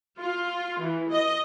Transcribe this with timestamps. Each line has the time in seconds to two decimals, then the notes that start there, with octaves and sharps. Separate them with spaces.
0.19 F4
0.79 E3
1.10 D#5